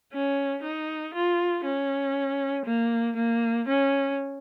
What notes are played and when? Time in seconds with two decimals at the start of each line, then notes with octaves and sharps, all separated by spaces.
0.13 C#4
0.63 D#4
1.14 F4
1.65 C#4
2.66 A#3
3.16 A#3
3.67 C#4